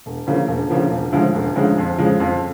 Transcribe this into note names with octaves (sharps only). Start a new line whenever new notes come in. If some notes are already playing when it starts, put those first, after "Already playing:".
E1
D2 C#3 F3 A#3
E1
D2 C#3 F3 A#3
E1
D2 C#3 F3 G#3
E1
D2 C#3 F3 G#3
F2
C#3 F3 G#3
F2